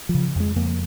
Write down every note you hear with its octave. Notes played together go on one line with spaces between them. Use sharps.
F3
C#3
F2 G#3
F2 A#3